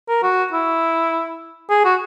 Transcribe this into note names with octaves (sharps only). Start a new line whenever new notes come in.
A#4
F#4
E4
G#4
F#4